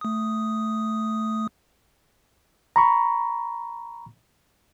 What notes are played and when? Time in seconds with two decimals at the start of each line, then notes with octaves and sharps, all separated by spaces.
0.01 A3 D#6
2.76 A#5 B5 C#6